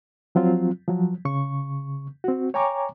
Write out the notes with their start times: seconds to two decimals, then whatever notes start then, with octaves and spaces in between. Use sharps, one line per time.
0.35 F3 F#3 C4 F4
0.88 F3 F#3
1.25 C#3 C#6
2.24 C4 F#4
2.54 C#5 G5 G#5 A#5 C#6 D6